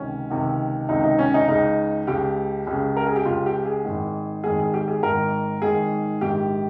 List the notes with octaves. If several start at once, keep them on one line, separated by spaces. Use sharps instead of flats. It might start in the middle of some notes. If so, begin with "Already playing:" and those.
Already playing: C#2 C3 D#3 C#4
C#2 C3 D#3
C#2 C3 D#3 D#4
D#4
C#4
D#4
C#2 C#3 D#4
C#2 C#3 G4
C#2 C#3
A#4
G#4
G4
C#2 C#3 F4
G4
G#4
G#1 G#2 D#3
G#1 G#2 D#3 G#4
G#4
G4
G#4
G#1 G#2 D#3 A#4
G#1 G#2 D#3 G#4
A#1 G#2 D#3 G4